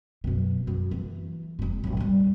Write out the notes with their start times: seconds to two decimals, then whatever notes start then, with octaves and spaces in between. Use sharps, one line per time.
0.24 F#2 B2
0.67 F#2
0.91 E3
1.59 F1 G#2
1.84 D1 A2
1.97 A2 G3